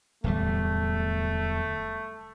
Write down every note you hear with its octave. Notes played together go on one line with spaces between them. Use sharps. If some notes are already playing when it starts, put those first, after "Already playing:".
D1 E2 G3 A3